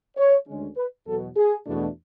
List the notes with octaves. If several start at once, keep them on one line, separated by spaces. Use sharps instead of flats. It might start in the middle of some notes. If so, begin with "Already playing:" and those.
C#5
D2 D3 G#3 C#4
B4
E2 B2 F#3 A4
G#4
E2 B2 A3 D4